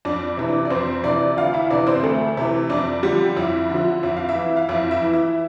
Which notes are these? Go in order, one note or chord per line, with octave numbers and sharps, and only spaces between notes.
F2 D4
C3 E3
D4
D5
F2 C4 C5
C3 E3 D4 D5
D2 F4 F5
E4 E5
C3 E3 D4 D5
C4 C5
D2 A3 A4
C3 E3
F2 D4
D3 F3 G3 G4
F2 E4 E5
D3
F3
F2 E5
F5
E4 E5
E3
F5
F2 E4 E5
E4 E5
E3
E4 E5